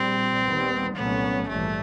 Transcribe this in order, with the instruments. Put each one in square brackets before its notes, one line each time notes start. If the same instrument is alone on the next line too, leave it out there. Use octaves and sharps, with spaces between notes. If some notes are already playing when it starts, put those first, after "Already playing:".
Already playing: [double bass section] A#1 A#2 G3 [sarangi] C4
[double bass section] D#2 D#3 G3 B3
[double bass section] C2 A#2 F#3 A3 C#4 [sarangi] B3
[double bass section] A#1 G#2 E3 G3 [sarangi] A3